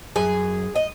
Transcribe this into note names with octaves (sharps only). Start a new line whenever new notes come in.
F#2 G#4
D#5